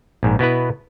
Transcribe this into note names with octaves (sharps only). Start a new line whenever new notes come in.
A#1 G#2
B2 B3 E4 B4